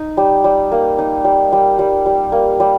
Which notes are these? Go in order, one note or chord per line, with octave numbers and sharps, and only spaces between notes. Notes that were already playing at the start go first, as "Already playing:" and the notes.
Already playing: D#4
G3
G3
A#3
D#4
G3
G3
G3
G3
A#3
G3